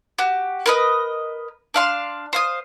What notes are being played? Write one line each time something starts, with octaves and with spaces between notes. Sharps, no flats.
F#4 G4
A#4 B4 D#5
D4 F5 C6
C5 F5 D#6